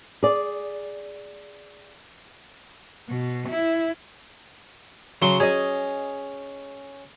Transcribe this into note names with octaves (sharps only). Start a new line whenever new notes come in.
G#4 D5
B2
E4
C#3 F#3 C6 C#6
C#4 G#4 D#5